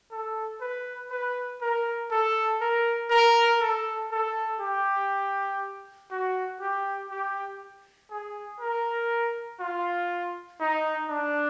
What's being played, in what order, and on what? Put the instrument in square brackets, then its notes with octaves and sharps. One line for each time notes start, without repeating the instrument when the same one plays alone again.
[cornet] A4
B4
B4
A#4
A4
A#4
A#4
A4
A4
G4
F#4
G4
G4
G#4
A#4
F4
D#4
D4